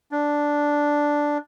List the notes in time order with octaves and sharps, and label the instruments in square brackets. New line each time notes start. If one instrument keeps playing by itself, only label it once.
[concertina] D4